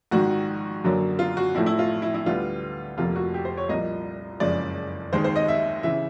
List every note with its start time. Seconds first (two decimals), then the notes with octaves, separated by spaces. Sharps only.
0.11 A#1 G#2 D#3 F#4
0.84 F#2 D3 F#3 A#3
1.19 F4
1.37 F#4
1.55 A#1 A2 F3 A3 E4
1.66 E4
1.79 F4
2.02 E4
2.14 E4
2.26 D2 D3 G3 B3 F4
2.97 F1 F2 C3 F3 A#3 F4
3.16 F#4
3.34 G4
3.45 C5
3.57 C#5
3.69 C2 A#2 F3 A#3 D#5
4.40 F#1 F2 C#3 F3 G#3 D5
5.13 D#2 D#3 G#3 C5
5.24 C5
5.36 D#5
5.48 E5
5.83 C#3 E3 E5